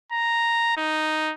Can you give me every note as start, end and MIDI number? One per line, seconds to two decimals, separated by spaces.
0.12 0.76 82
0.77 1.33 63